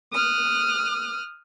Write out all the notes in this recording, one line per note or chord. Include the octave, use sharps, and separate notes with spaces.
D#6 F6 F#6